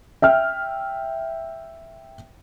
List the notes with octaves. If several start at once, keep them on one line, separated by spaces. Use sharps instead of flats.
E5 G5 F6